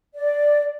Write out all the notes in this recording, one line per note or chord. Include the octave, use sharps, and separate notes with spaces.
D5